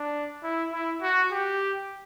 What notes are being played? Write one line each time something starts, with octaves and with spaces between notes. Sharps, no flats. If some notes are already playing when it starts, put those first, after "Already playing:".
Already playing: D4
E4
E4
F#4
G4